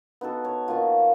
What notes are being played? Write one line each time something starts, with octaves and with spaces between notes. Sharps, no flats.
B3 D#4 F#4 A4
C#5
D#3 A#3 D#4 F4